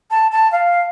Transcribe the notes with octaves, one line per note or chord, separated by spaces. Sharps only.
A5
A5
F5